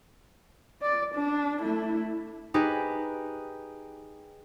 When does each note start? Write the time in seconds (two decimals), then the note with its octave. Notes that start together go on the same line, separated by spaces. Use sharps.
0.82 D5
1.15 D4
1.62 A3 E4
2.54 D#4 G4 G#4 B4